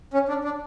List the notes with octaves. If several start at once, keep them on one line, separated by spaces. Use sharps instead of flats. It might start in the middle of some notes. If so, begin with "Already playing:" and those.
C#4
D4
D4